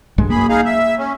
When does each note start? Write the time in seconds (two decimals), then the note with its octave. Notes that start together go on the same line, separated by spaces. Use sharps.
0.18 B1 G2 G#3
0.30 F#2 A#3 G#4 B5
0.49 D#4 G#4 F5
0.65 E5
0.99 C#4